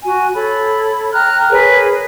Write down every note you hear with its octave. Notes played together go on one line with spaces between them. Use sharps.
F#4 G#5
A4 C#5 B5
G5 A#5 F6 F#6
G#4 A#4 B4 C#5